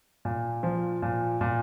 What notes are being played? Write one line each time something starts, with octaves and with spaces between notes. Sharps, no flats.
A#2
F3
A#2
A#2